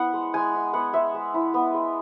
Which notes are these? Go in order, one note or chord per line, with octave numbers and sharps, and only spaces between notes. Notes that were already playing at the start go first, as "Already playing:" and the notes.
Already playing: B3 E4 F#5
G#3
G#3 G#5
E4
B3 F#5
G#3 E5
G#3
E4
B3
G#3